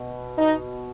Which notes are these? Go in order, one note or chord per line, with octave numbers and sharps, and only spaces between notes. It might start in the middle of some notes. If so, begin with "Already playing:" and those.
Already playing: B2
D#4